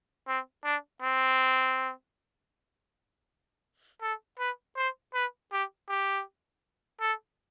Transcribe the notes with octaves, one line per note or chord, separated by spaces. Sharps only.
C4
D4
C4
A4
B4
C5
B4
G4
G4
A4